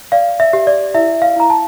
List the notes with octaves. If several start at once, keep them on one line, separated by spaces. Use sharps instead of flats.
D5 F5
E5
G4
D5
E4 E5
F5
E4 A#5
A5